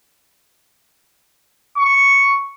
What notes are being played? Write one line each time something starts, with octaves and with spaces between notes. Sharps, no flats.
C#6